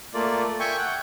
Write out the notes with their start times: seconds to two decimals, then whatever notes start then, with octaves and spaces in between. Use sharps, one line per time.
0.14 A3 A#3 F4 D5
0.60 E5 G5 G#5 C#6
0.78 F#5 G5